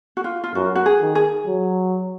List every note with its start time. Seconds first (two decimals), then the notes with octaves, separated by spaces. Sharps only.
0.17 F#4
0.24 F4
0.44 F4
0.55 F#2 F#4
0.75 F#4
0.86 G#4
1.01 D#3
1.15 G#4
1.46 F#3